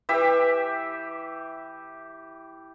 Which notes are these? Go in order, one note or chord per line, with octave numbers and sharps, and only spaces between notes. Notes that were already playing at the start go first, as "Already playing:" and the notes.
E3 G4 E5